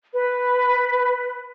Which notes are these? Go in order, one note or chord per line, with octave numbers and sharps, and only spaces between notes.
B4